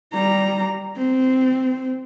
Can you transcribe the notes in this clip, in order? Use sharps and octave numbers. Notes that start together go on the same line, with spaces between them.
G3 A#5
C4